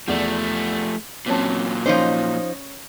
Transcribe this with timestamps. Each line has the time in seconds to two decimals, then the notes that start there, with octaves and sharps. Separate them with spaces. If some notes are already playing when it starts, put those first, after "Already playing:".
0.08 E2 F3 A3 D5
1.26 A#2 F#3 C4 C#4 A5
1.86 F3 C#4 D#4 C5